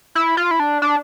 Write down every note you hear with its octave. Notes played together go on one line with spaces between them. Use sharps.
E4
F4
E4
D4
D4